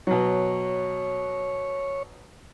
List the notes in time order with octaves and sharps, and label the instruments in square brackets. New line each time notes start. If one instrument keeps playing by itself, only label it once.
[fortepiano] B2 F#3 [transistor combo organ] C#5